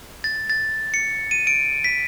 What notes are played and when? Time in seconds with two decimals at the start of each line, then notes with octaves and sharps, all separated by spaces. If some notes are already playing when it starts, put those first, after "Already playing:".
0.24 A6
0.50 A6
0.94 C#7
1.31 D#7
1.47 D7
1.84 B6